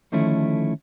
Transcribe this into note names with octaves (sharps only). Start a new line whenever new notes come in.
D2 D#3 F3 A3 C#4 E4